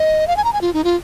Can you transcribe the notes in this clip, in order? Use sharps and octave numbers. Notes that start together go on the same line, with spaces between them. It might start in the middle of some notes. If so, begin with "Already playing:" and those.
Already playing: D#5
F5
G#5
A#5
G#5
F4
D#4
F4